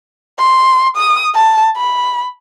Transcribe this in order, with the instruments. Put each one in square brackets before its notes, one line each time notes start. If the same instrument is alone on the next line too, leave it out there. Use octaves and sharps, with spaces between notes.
[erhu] C6
D#6
A5
B5